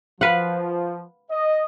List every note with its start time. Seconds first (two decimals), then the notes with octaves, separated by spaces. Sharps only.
0.21 F3 B4 F5 F#5
1.31 D#5